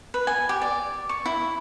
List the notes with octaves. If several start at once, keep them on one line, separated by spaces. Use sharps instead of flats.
B4
G#5
G4
D5
C#6
E4